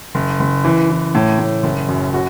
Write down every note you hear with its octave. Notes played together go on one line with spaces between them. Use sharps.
F#1
F#1
E3
E3
A2
A2
F#1
F#2
F#4